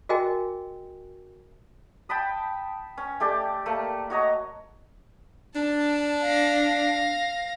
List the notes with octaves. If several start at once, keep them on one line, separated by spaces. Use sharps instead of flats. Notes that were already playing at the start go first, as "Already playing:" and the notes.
F#4 G#4 A#4 D#5 G5 G#5
G5 A5 B5 D#6
C#4
A3 G4 D5
A3 A#3
F#4 C#5 D#5 A#5
D4 A5
F5 A#6